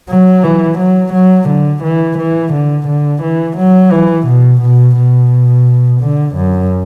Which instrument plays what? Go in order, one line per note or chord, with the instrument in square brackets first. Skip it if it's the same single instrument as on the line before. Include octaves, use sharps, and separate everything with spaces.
[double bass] F#3
E3
F#3
F#3
D3
E3
E3
D3
D3
E3
F#3
E3
B2
B2
B2
D3
F#2